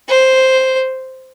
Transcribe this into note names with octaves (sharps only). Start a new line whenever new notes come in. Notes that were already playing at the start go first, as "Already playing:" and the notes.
C5